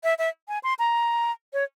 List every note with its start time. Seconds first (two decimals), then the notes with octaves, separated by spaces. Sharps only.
0.04 E5
0.19 E5
0.48 G#5
0.63 C6
0.79 A#5
1.53 C#5